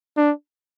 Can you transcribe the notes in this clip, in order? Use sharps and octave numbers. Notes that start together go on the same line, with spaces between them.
D4